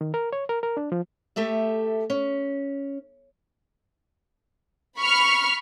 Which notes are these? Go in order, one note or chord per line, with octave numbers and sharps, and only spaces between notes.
D#3
A#4
C#5
A#4
A#4
D4
F3
A3 G4 A4 E5
C#4
B5 C#6 F6